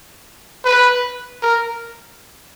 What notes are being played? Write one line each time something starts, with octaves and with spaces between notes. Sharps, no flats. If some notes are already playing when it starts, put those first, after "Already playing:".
B4
A#4